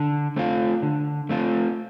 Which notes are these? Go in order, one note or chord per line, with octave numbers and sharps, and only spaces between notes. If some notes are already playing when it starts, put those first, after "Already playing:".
Already playing: D3
A3 C4 F4
D3
A3 C4 F4